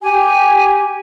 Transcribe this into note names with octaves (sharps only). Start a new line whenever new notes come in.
G4 G#5